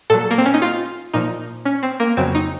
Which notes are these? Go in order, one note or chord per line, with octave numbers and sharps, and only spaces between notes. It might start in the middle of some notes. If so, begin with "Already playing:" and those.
A#2 F#3 A4
A#3
C4
C#4
D#4
F4
A#2 F3 D#4
C#4
C4
A#3
F2 C#3 F#3 C4
D#4